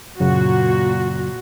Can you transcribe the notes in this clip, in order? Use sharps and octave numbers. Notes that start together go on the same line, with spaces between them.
F#2 A#2 C#3 F#3 F#4